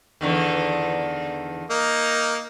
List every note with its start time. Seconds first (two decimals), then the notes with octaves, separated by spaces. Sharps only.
0.21 E2 D3 D#3
1.70 A#3 D#4